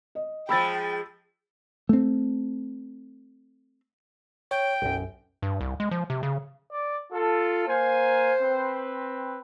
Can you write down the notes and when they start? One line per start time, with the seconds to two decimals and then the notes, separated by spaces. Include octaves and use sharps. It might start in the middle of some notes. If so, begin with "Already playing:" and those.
0.15 D#5
0.49 F3 G#3 G5 B5 E6 A6
1.89 A3 C4
4.51 C#5 G5
4.82 B1 F#2
5.42 G2
5.61 C2
5.80 G#3
5.91 F3
6.10 C3
6.23 C#3
6.71 D5
7.13 F4 A4
7.68 A#3 C5 F5 G#5
8.42 C4 B4